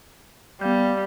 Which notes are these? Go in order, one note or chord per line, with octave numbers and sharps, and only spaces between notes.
G3 B3 F5 G6